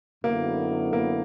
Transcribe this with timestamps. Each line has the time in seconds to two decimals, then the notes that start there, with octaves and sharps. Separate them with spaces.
0.24 F#2 D3 F#3 A#3 B3 E4
0.93 A#3